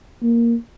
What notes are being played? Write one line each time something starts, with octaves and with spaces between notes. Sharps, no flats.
A#3